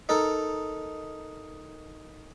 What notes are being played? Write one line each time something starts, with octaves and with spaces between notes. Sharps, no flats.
D#4 A4 A#4